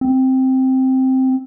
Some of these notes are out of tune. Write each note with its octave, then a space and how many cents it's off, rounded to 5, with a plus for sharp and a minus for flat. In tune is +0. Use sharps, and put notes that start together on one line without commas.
C4 +0